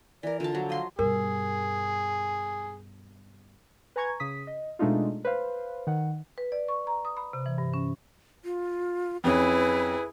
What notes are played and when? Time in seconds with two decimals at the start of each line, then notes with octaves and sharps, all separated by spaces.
0.23 E3 A#4 D5
0.40 D3 F4 A5
0.53 F3 F#3
0.70 D#5 F5 C6
0.99 G2 B2 G#4 A#4
3.96 B4 G#5 A#5 C#6 G#6
4.20 C#3 D#6 B6
4.47 D#5
4.79 B2 G#3 A3 D4 D#4 F4
5.25 B4 C5 F5
5.87 D#3 F#5
6.38 B4
6.52 D5
6.68 C#6
6.87 A#5
7.05 D#6
7.17 B5
7.33 C3
7.46 E3
7.58 G2
7.74 C#4
8.45 F4
9.24 F2 C#4 E4 G#4 B4